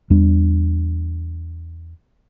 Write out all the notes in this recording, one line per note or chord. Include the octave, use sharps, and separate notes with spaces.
E2 G3 D4